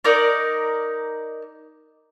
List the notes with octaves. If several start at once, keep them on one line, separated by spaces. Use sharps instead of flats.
D#4 A#4 D5